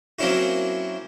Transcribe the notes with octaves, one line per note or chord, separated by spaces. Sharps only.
F#3 A#3 C4 C#4 E4 F#4